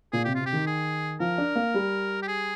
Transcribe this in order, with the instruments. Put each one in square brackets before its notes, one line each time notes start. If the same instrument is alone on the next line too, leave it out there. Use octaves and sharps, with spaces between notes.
[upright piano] A#2 [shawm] G#4
[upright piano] C3 [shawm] G4
[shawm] F4
[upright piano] C3
[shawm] G4
[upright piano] D#3
[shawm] G#4
[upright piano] F3 [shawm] A#4
[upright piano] D4
A#3
G3
[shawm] G4
G#4